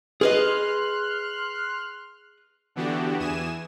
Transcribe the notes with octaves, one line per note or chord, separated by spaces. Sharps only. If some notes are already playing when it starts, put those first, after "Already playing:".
G#4 B4 D#5 C6 F6 F#6
D3 E3 B3 D4 F#4 G4
E2 E3 G#5 D#6 E7